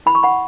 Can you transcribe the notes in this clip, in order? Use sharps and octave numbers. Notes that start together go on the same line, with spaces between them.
E4 B5
C#6
F#5 B5